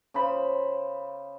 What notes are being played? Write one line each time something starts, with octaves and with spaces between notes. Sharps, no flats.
C#3 C5 B5